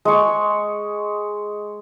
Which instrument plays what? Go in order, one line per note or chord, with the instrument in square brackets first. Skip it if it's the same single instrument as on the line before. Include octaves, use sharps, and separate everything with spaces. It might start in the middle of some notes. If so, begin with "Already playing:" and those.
[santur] G#3 C#6